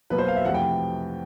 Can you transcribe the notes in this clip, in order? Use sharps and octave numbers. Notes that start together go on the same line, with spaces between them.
B1 B2 F#3 A#3 B4
C5
F5
E5
F2 C3 E3 A3 F#5
G5